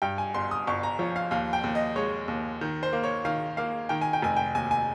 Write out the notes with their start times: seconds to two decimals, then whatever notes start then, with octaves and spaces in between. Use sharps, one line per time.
0.02 G2 G5
0.18 G#5
0.34 G1 C6
0.51 D#6
0.67 G1 C#6
0.83 A#5
0.99 F3 C#5
1.16 F5
1.31 D#2 F5
1.53 G5
1.64 D#2
1.75 D#5
1.96 G#3 C#5
2.28 D#2
2.61 D#3
2.83 C5
2.93 A#3
3.04 C#5
3.25 D#3 F5
3.57 A#3 F5
3.89 D#3 G5
4.01 G#5
4.13 G5
4.22 F1 G#5
4.37 G5
4.55 D#2 G#5
4.71 G#5